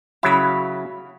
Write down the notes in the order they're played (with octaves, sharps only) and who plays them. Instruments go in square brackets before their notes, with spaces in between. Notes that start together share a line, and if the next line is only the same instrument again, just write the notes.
[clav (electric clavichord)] C#3 F#3 E4 [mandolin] F5 B5